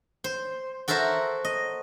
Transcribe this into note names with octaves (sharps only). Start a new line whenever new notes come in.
C5
F#4 A4 A#4 C5 E5
D#5